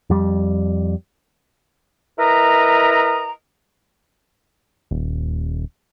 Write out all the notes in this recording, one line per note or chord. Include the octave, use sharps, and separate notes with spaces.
F2 G3
E4 A#4 B4 D#5 A#5
D#1